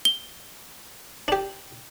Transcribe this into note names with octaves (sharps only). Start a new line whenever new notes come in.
G7
D4 G4